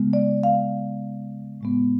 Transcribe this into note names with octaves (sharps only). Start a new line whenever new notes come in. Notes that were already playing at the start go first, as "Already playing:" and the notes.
Already playing: C#3 G#3 B3
D5
F5
A2 G#3 B3